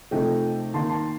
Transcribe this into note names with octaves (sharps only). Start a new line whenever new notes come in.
C3 F3 A3 D#4 D#5 G5
D#3 A#3 D#4 A5 C6
A5 C6